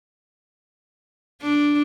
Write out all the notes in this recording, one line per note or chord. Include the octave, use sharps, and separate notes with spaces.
D4